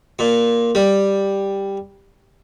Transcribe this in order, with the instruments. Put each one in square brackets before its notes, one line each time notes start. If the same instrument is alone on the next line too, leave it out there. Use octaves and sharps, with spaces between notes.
[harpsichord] A#2
G3